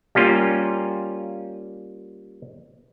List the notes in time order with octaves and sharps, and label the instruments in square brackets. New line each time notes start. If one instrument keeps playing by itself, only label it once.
[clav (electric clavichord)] G3 A#3 C#4 F4